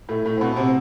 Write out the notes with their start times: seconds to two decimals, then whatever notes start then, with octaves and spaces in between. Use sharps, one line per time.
0.09 A2 A3
0.25 A2 A3
0.37 C4
0.41 B2 B3
0.56 C3 C4